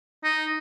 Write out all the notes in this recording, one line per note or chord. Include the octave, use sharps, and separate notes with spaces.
D#4